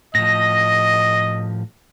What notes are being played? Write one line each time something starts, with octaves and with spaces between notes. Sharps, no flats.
A2 F3 D#5 A#6